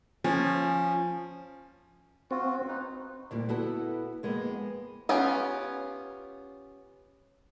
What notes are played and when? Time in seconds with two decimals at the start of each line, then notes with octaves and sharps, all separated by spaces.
0.24 F3 C#4
2.31 C4 F4 F#4
2.69 D#4 B4
3.31 D2 A#2 G3
3.49 B3 E4 F#4 A4
4.23 F2 G#3 A#3 B3
5.09 B3 C#4 F4 G4